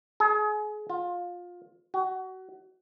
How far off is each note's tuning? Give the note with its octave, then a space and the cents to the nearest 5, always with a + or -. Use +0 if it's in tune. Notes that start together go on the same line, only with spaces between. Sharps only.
G#4 +35
F4 +20
F#4 +25